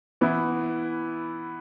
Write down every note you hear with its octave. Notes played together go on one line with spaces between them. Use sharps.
E3 B3 E4